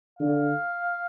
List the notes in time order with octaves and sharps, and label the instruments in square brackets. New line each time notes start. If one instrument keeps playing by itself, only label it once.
[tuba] D3 [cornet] F5